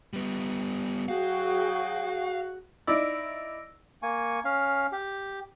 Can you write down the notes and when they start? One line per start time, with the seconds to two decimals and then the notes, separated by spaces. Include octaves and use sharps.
0.13 G3 B3
1.08 F#3 F#4 G#4 F5 G5
2.87 D#4 E4 D5 E6 A#6 D7
4.02 A#3 G#5 C#6
4.45 C#4 F5
4.92 G4